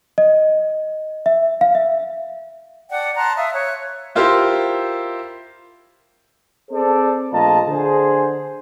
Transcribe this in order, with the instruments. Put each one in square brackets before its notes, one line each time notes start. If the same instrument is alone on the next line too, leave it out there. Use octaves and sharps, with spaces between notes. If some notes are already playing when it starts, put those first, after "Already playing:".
[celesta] D#5
E5
F5
E5
[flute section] D5 F#5 G5 A5
A5 A#5 C6 F#6
E5 F5 D#6
C#5 F#6
[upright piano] E4 F4 G4 A#4 C5
[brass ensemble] C4 G#4 A4 C5 D5
A#1 A3 F4 D#5 A5 A#5
D3 G#4 C5